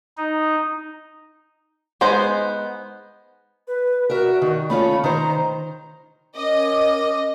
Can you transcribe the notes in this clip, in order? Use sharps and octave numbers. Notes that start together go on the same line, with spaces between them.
D#4
G#3 B3 D#4 C5
B4
F#4 A#4 E5
D#3
A3 C#4 F4 B5
D#3 C5 A#5
C#4 A#4 D#5 D6